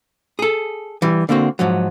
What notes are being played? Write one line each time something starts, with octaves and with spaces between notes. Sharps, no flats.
G#4 A4
E3 G3
D3 A#3 C4 F#4
G#2 F3 F#3